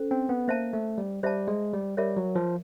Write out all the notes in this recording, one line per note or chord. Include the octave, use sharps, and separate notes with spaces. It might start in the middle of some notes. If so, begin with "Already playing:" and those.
Already playing: C#4 A4 C5
C4
B3
A#3 C5 E5 A5
A3
G3
G3 C5 E5 A5
G#3
G3
G3 A#4 C#5 E5
F#3
F3